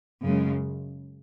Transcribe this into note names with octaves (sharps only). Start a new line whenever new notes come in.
F#2 C#3 G#3